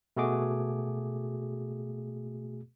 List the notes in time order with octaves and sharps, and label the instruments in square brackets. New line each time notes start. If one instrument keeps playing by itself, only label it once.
[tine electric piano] B2 A3 F#4 G#4 D6